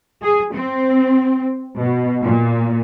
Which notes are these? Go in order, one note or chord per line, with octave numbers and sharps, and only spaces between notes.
G#4
C4
B2
A#2